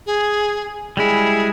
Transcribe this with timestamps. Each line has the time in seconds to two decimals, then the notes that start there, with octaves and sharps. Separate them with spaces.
0.06 G#4
0.97 G3 G#3 E4 G#4